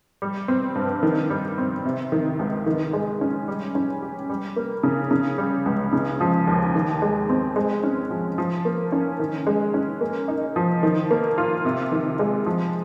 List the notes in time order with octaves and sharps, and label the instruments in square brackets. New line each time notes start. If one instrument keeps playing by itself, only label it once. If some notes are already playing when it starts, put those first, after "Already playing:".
[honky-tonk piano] G3
C4
G2
D#3
G3
C4
C3
D#3
C#2
D#3
G#3
C#4
G3
C#4
G4
G3
A#3
C#3
C#3
G3
C#2
C#3
F3
D#2
D#3
G#3
C4
G#3
C#4
F3
F3
A#3
C#4
D#3
G#3
C#4
A#3
D#4
F3
D#3
A#3
F4
C3
D#3
G#3
F3